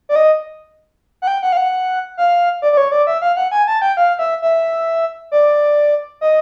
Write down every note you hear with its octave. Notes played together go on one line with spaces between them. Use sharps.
D5
D#5
F#5
G5
F#5
F5
F#5
F5
D5
D5
C#5
D5
E5
F5
F#5
G#5
A5
G5
F5
E5
E5
D5
D#5